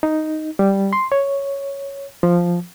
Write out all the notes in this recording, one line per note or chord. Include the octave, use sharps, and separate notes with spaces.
D#4
G3
C6
C#5
F3